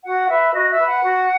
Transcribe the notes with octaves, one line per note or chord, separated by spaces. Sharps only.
F#4 F#5
B4 E5
F#4 D#5
E5
B4
F#5
F#4